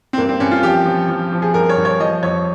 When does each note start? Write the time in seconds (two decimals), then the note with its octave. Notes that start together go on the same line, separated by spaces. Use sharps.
0.13 C4
0.18 G2 A#3
0.29 C4
0.40 G2 C#4
0.51 F4
0.63 F3 G4
0.86 F3
1.09 F3
1.32 F3
1.42 G#4
1.54 G2 A#4
1.69 C#5
1.77 G2
1.85 C#5
2.00 F3 D#5
2.23 F2 C#5